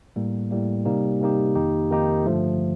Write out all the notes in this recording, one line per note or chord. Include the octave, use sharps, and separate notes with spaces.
A2 G3 A#3
A2 G3 A#3
C3 G3 A#3 D#4 G4
C3 G3 A#3 D#4 G4
F2 D#3 A#3 D#4 G4
F2 D#3 A#3 D#4 G4
G2 D3 F3 A3